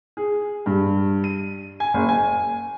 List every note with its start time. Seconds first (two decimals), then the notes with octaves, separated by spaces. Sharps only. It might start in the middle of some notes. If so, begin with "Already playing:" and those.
0.17 G#4
0.66 G2
1.24 D#7
1.80 G#5
1.94 F#1
2.09 G#5